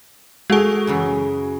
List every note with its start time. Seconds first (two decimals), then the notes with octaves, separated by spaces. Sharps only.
0.50 G#3 F#4 G#4 A4
0.87 F#2 C#3 E3